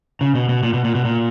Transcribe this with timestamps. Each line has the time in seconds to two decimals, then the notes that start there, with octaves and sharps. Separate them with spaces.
0.21 C#3
0.35 B2
0.49 B2
0.63 A#2
0.74 B2
0.84 A#2
0.95 B2
1.05 A#2